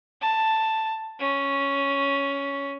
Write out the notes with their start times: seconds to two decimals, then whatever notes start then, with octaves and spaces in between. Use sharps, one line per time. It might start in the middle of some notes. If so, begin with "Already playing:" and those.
0.21 A5
1.19 C#4